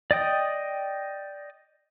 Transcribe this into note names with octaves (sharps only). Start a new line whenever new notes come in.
D5 D#5 G5 D#6